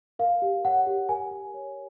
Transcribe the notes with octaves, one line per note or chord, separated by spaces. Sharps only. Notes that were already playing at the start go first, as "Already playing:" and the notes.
A#4 F5
G4
C#5 F#5
G4
A#4 G#5
G4
C#5